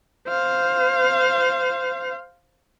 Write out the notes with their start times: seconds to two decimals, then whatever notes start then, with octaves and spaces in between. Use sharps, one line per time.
0.28 C5 F5